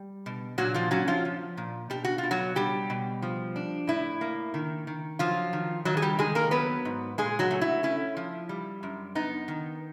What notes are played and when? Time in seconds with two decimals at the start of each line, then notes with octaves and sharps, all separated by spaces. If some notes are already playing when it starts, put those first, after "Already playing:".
Already playing: G3
0.26 B2
0.58 A#2 F#3 F#4
0.74 F3 F4
0.91 F#3 C#4 F#4
1.08 F3 F4
1.25 F3
1.57 A#2
1.90 B2 G4
2.05 F#4
2.18 F4
2.23 B2
2.31 F#3 F#4
2.55 F#3 G3 G4
2.90 B2
3.22 F3
3.56 D4
3.87 A2 E4
4.21 A#3
4.54 D#3
4.87 D#3
5.19 F3 F#3 F4
5.53 D#3
5.85 D#3 F#3 F#4
5.97 G#4
6.02 G3 G4
6.19 D#3 G#3 G#4
6.35 A#3 A#4
6.51 F#3 B3 B4
6.85 G#2
7.18 A#2 G#3 G#4
7.39 F#3 F#4
7.51 A3
7.61 E4
7.83 C#4 E4
8.17 F3
8.49 G3
8.83 F#2
9.15 B3 D#4
9.48 D#3